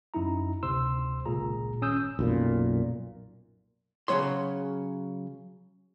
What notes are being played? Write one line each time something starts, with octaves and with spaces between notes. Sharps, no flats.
F#2 D#4 E4 A#5
D2 C3 C5 C6 E6
G#1 C#2 A#2 G#4 A#5
G#1 C#4 D#6 E6 G6
B1 F#2 A#2
C#3 E3 F#3 C#5 C6